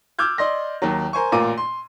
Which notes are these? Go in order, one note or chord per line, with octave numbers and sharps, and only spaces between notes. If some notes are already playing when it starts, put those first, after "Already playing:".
D6 E6 F6 G6 G#6
D5 D#5 C6 A#6
D#2 D#3 F#3
A#4 C5 G#5 C#6
A1 A#2 F4 A#4 D6 D#7
C6